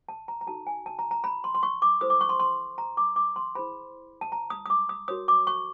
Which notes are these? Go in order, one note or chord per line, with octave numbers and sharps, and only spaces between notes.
A5
A#5
A#5
D#4 F#4 A4 A5
G#5
A5
A#5
A#5
B5
C6
C6
C#6
D6
E4 A4 C5 D#6
D6
C#6
C6
C6
A#5
D6
D6
C6
E4 G#4 C5 B5
A5
A#5
D#6
D#6
D6
D#6
F#4 A#4 C#5 D#6
D6
C#6